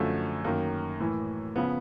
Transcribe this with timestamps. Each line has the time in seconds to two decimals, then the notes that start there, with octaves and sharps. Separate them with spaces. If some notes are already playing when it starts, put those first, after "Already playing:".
Already playing: F#2 D3 F3 A3
0.45 F#2 D#3 A#3
1.00 A2 E3
1.56 C#3 F3 B3